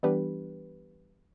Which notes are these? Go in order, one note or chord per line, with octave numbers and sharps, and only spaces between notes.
E3 G3 B3 D4 G4 B4